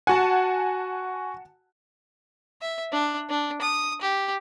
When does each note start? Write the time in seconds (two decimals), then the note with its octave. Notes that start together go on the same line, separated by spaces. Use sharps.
0.07 F#4 F#5 G#5 A5
2.62 E5
2.92 D4
3.29 D4
3.62 D#6
4.02 G4